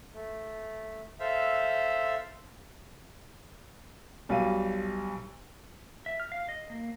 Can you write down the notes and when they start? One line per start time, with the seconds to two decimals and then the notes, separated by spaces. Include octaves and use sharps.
0.14 A3
1.20 A4 C5 E5 F5
4.29 B1 G3 F5 D#7
6.06 E5
6.20 F6
6.32 F5
6.49 D#5
6.70 A#3